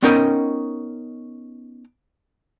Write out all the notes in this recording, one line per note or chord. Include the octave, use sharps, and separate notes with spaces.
B3 C#4 D#4 A#4 D#5 G5